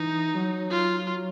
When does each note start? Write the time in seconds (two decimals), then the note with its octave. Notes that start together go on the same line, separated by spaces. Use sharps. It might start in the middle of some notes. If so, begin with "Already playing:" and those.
Already playing: E3 D#4
0.34 F#3
0.71 F4